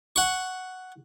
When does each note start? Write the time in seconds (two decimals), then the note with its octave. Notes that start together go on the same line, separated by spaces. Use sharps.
0.16 F#5 C#6